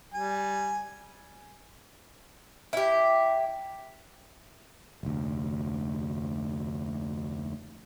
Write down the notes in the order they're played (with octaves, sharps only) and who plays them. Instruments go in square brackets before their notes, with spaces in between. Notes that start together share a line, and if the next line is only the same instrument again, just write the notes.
[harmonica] G3 G#5
[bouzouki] E4 G4
[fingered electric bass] F1 D2